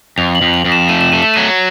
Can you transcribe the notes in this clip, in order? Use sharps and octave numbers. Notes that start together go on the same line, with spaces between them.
F2 F7
F#7
F2
F7
F2
E7
A3 D#7
E7
A3 D#7
E7
F#3 D#7